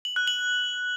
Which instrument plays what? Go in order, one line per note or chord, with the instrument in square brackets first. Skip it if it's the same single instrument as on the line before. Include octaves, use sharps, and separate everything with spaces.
[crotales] F#7
F#6
F#7